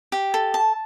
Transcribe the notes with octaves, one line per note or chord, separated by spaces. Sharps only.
G4
A4
A5